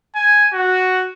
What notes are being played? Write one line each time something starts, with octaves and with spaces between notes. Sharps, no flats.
G#5
F#4